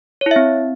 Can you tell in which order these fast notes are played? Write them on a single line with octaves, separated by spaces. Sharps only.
C#5 E4 E5 C4